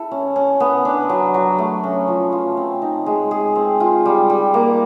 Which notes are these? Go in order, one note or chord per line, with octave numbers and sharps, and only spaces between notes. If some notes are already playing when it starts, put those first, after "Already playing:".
Already playing: E4 A4
C#4
C#4
B3
D4
F#3
F#3
A3
C#4
F3
F4
C4
D#4
G#3
G#4
C4
F4
G3
G3
A#3